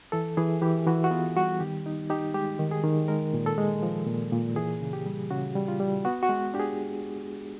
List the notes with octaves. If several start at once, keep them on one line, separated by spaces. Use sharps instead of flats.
E3 A4
E3 G#4
E3 G4
E3 F#4
F#4
B3 F4
G3 F#4
D#3 G4
D#4
D#4 G4
G#3 G4
D#3
G#4
D#3
G#3 A#4
A#2
A4
G#3
F3
A#2
A#2
E3 G#4
C#3
G4
G3
C#3 F#4
G3
F4
G3
B3 F#4
F#4
G#3
D4 G4
G#4